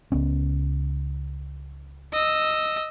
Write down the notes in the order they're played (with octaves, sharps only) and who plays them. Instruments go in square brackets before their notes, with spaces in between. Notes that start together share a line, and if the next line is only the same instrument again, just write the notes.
[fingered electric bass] C#2 B3 C#4
[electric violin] D#5 E6